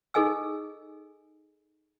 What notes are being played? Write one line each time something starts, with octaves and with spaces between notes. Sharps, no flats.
D#4 G#4 A4 D#5 G#5 E6